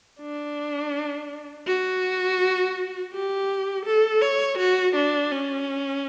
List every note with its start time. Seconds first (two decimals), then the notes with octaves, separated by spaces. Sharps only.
0.20 D4
1.66 F#4
3.13 G4
3.86 A4
4.22 C#5
4.58 F#4
4.95 D4
5.32 C#4